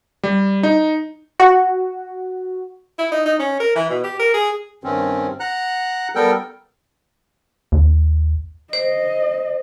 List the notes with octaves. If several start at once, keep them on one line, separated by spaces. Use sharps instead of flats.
G3
D#4
F#4
E4
D#4
D#4
C#4
A#4
E3
B2
G4
A#4
G#4
G2 D#3 C4 C#4
F#5 A#5 F#6
G3 B3 A4 A#4 G5
D#2
C5 D#5